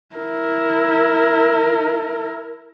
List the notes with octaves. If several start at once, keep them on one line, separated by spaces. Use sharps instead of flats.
E4 A#4